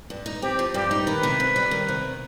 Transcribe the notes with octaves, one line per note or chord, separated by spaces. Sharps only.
G2
D#4
C4 G4
F3
G2 G4
D#4
D#3 B4
C3
F2
G3
D#3
C3